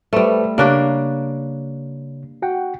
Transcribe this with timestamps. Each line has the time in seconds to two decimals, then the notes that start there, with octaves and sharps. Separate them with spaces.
0.13 G3 A3 A4 B4 C5
0.58 C#3 A#3 D4 G4 C#5 F#6
2.42 F#4 F#5 G5